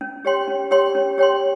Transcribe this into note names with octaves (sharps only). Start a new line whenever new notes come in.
C#4
G4 C#5 G5 C6
C#4
G4 C#5 G5 C6
C#4
G4 C#5 G5 C6